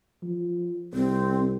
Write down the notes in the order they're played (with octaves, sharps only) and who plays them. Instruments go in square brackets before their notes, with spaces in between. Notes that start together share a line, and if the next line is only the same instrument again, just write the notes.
[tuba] F3
[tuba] C2 [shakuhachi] C4